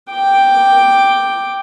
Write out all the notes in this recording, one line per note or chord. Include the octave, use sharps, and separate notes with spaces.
G5 D6